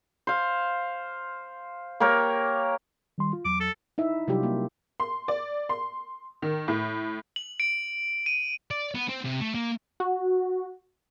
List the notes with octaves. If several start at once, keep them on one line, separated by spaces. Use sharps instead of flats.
C5 F5
A#3 G4 A#4 C#5
D#3 G3 C6
F4
E2 F#3 D6
A4
D#4 E4 E5
C3 F#3 G3 D#4 F4 G4
A#3
C6
D5
C6
D#3
A2
F#7
D7
D#7
D5
B3
C4
C3
A3
A#3
F#4